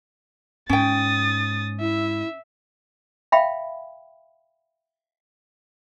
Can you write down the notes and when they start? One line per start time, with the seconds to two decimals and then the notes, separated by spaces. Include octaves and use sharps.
0.69 G#2 C#4 G5 D#6 A6
1.80 E4 E5
3.32 E5 F5 G5 B5